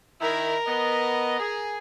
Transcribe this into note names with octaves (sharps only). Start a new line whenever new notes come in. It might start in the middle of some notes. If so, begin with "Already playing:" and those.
D#3 E4 A#4
B3 D#5
G#4